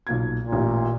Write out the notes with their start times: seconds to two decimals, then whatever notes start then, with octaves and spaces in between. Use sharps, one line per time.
0.07 B1 A#2 G#6
0.40 A#2
0.53 A1